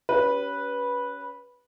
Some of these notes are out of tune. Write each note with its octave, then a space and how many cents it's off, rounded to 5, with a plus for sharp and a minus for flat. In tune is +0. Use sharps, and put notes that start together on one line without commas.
C#4 +25 G4 -15 B4 -10